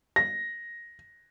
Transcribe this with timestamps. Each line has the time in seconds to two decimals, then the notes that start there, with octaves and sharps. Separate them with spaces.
0.16 A#6